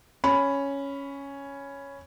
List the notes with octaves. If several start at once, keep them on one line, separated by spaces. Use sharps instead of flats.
C#4 B5